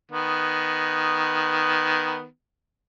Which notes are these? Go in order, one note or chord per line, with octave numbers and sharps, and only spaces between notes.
D#3 B3